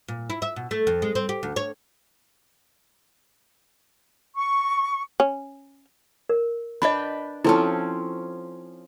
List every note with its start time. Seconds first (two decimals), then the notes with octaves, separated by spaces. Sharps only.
0.08 A#2
0.30 E4
0.42 E5
0.56 B2
0.71 A3
0.87 F2
1.02 G#3
1.15 C4
1.29 G4
1.43 D2
1.56 C#5
4.36 C#6
5.20 C#4
6.29 A#4
6.82 D4 B4 D#5 G5 B5
7.44 F3 C4 C#4 E4 A4 A5